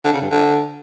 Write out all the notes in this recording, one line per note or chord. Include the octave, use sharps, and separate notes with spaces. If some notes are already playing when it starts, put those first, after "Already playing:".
D3
C#3
G2
D3